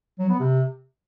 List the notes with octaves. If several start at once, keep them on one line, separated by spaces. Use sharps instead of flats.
F#3
B3
C3